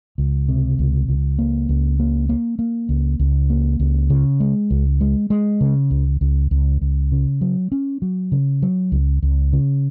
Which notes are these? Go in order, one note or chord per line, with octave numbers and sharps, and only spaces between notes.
C#2
C3
C#2
C#2
A#3
C#2
A#3
A#3
A#3
C#2
C#2
A#3
C#2
C#3
G#3
C#2
G#3
G#3
C#3
C#2
C#2
C#2
C#2
C#3
F#3
C#4
F#3
C#3
F#3
C#2
C#2
C#3